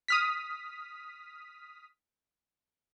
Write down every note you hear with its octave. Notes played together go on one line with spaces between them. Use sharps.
D#6 F6 B6